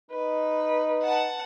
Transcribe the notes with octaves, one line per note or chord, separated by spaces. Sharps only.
D#4 B4
F#5 A5